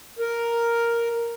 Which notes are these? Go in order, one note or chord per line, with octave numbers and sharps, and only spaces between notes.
A#4